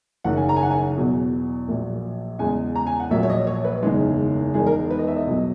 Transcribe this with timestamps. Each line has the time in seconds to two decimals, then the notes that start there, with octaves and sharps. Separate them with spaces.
0.24 F#1 F#2 D#3 F#5
0.37 G#5
0.49 A#5
0.56 G#5
0.63 F#5
0.71 G#5
0.97 E2 B2 F#3
1.68 A#1 A#2 F#3
2.39 E2 C#3 G#3 G#5
2.76 A#5
2.87 G#5
3.00 F#5
3.11 A#1 A#2 F#3 E5
3.23 C#5
3.30 D#5
3.47 C#5
3.65 B4
3.83 F#1 E2 D#3 G#3
4.54 E1 E2 D#3 G#3 G#4
4.66 A#4
4.91 B4
4.99 D#5
5.07 E5
5.16 D#5
5.27 B1 B2 F#3